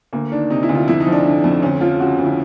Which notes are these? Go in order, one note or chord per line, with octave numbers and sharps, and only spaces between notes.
D2 A#3
D#3 D4
C3 D#4
E4
D2
F4
F2 E4
D#4
F3
D4
D3
F2
D2 C#4
F3 F4
C#3 F#4
D2
E4